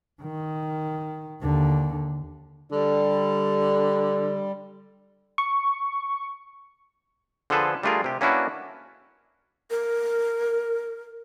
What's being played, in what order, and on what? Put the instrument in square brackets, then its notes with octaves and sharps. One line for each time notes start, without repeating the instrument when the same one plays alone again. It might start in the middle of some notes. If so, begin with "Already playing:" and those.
[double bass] D#3
D#2 D3
[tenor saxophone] D3 [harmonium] G3
[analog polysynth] C#6
[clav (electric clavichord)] D3 F3 G#4 A4 B4 C5
G3 A3 D4 F4 G#4 A#4
C3 G4
A#3 C#4 D4 E4 F#4 B4
[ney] A#4